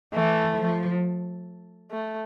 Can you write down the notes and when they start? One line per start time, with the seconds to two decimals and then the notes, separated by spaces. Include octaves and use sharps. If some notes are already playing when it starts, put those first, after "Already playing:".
0.13 E3 A3
0.57 F3
1.91 A3